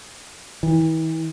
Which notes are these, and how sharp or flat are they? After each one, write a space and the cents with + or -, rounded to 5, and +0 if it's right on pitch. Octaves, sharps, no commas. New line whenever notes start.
E3 -40